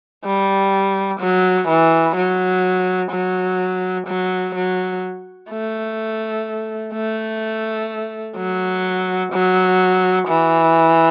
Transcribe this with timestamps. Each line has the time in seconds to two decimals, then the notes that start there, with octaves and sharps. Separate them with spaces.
0.25 G3
1.20 F#3
1.68 E3
2.16 F#3
3.11 F#3
4.07 F#3
4.55 F#3
5.50 A3
6.93 A3
8.37 F#3
9.33 F#3
10.28 E3